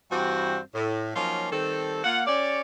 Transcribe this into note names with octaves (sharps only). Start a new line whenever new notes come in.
G2 E3 G3 C4 F#4
A2
F3 F#3 A#3 C#4 D#4 F4
D#3 G3 C4 A4
A#3 F4 F5 F#5
C#4 G4 C#5 D5